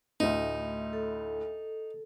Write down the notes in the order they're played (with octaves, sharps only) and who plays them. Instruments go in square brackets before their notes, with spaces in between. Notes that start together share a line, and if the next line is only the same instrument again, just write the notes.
[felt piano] D2 A2 [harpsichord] D#4
[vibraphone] A4